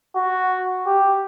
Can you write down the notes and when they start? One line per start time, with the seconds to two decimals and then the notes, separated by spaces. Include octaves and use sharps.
0.16 F#4
0.86 G4